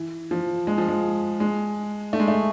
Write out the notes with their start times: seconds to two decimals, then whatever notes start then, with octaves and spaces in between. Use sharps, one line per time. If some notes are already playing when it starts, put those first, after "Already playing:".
Already playing: E3
0.31 F3
0.67 G#3
0.78 F3
0.88 G#3
1.40 G#3
2.13 A3
2.20 G#3
2.28 A3